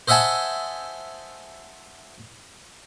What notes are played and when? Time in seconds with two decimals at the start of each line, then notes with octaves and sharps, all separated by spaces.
0.08 C5 D#5 E5 F#5 G#5 A5